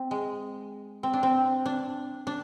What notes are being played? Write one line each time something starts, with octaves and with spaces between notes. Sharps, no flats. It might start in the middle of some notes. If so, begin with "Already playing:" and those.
Already playing: C4
G#3
C4
D4
C4
D4
D4